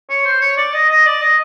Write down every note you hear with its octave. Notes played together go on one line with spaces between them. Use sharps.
C#5
C5
C#5
D5
D#5
D#5
D5
D#5